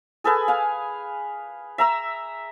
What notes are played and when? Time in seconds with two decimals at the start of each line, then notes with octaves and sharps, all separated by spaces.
0.24 G#4 A4 B4 G#5
0.48 F5 G#5
1.78 E5 A#5 E6